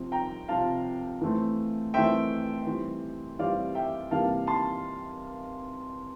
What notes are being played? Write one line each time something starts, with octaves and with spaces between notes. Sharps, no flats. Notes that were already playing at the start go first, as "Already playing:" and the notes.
Already playing: C3 F3 C4
G5 A#5
C3 F3 C4 F5 A5
E3 A3 C4
E3 A3 C4 E5 G5
E3 G3 C4
E3 G3 C4 D5 F5
E5 G5
C3 E3 G3 A#3 F5 A5
A5 C6